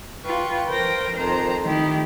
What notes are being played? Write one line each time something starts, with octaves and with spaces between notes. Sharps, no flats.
F4 B4 G5 C#6
A#4 C5 G5 A#6
F2 D#3 C5 A#5
D#3 A3 D#4 E4 G4